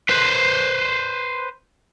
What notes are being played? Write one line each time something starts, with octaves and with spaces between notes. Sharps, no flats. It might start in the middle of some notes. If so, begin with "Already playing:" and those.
B4 C5